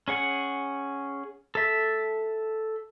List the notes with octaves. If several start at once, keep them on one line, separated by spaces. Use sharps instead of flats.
C#4 G#4 F#5
A4 E5